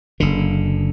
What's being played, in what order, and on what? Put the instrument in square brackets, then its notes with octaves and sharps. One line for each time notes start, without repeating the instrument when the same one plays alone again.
[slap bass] F#1 D3